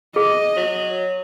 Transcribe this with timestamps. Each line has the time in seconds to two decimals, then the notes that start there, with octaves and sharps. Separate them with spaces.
0.16 G#4 D#5
0.56 F#3